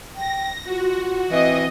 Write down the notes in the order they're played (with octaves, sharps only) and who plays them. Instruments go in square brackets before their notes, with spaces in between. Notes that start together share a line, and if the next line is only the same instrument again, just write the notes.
[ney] G5 [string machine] A#6
[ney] F4 [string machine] F#4
[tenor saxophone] E3 [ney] C4 [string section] D#5